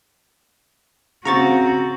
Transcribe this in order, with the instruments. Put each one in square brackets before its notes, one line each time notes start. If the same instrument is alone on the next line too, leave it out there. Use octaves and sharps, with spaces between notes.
[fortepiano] C#3 C4 [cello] F#4 [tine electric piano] A#5 C#6 A6